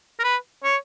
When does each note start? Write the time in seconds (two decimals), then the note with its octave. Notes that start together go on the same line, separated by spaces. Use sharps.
0.19 A#4
0.24 B4
0.64 C#5